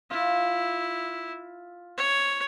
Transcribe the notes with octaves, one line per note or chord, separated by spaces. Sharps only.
E4 F4
C#5